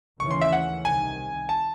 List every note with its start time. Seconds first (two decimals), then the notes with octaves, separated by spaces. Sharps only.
0.20 D#2 C#3 E3 A3 C#4 C#6
0.31 C6
0.41 E5
0.52 F#5
0.85 C2 C3 D#3 G#5
1.49 A5